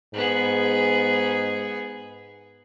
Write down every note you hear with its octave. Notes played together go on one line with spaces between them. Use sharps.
G#2 B3 G#4